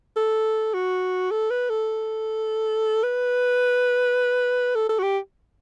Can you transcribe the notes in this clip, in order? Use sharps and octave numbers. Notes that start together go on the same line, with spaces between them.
A4
F#4
A4
B4
A4
B4
A4
A4
F#4
G4